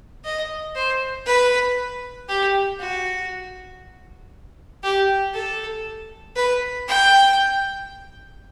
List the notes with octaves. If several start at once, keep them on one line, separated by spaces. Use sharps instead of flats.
D#5
C5
B4
G4
F#4
G4
A4
B4
G5